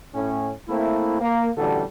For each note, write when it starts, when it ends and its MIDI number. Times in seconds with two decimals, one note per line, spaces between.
0.15 0.52 45
0.15 0.52 61
0.68 1.19 57
0.68 1.19 58
0.68 1.19 60
0.68 1.19 64
1.21 1.50 58
1.56 1.83 33
1.56 1.83 50
1.56 1.83 55
1.56 1.83 66
1.56 1.83 69